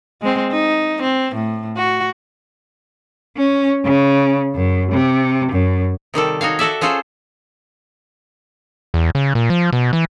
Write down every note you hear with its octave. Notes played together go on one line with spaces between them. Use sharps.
G#3 C4
D#4
C4
A2
F#4
C#4
C#3
F#2
C3
F#2
C3 D#3 G3 A4
D#4 F#4 C#5 F5
F#4 A4 D5 E5
C#4 F4 G#4 A4 C5
E2
C#3
A#2
F3
B2
E3